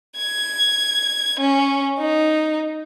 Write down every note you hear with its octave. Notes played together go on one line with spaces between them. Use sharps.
G#6
C#4
D#4